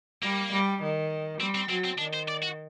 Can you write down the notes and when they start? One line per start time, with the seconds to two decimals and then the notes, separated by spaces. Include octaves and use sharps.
0.23 G3 A#3
0.52 G3
0.82 D#3
1.40 G3 C4
1.55 C4
1.69 F#3 C4
1.84 C4
1.98 D#3 D4
2.14 C5
2.29 D5
2.43 F#4